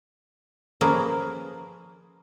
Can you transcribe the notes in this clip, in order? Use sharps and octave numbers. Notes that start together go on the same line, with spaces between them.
F3 A#3 C#4 G#4 A#4 B4